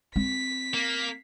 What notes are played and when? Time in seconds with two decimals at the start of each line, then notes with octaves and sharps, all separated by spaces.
0.16 C4 B6
0.74 A#3